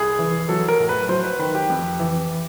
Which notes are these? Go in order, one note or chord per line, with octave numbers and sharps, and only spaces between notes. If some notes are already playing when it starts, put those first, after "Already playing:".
Already playing: C2 G#4
E3
F#3 A4
A#4
A2
B4
F#3 C5
B4
D#3 B4
G4
F2
E3